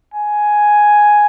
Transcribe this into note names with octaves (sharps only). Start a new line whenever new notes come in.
G#5